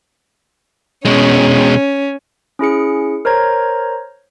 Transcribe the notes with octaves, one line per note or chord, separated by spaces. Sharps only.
B2 G#3 C#4
C#4 E4 G#4 C#7
A#4 C5 C#5 A#5 G#6